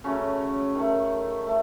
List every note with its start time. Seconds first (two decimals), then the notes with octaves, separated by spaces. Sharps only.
0.04 C#3 F#3 A3 C#4
0.75 D#3 A3
1.47 A3